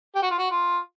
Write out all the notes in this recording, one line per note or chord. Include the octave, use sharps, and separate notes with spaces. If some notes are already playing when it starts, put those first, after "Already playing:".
G4
F#4
F4
F#4
F4